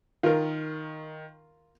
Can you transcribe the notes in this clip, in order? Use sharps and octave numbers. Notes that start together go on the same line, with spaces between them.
D#3 F4 A#4